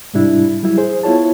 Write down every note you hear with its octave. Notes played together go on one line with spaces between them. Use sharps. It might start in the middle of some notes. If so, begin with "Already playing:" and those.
G#2 C3 G3 D4 E4
F#3 G3 E4
G#4 C5
B3 E4 F4 C#5 A5